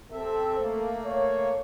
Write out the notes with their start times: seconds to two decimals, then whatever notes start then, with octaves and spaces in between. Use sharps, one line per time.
0.12 C3 C4 A4 E5
0.59 A3 A#3
1.05 C#5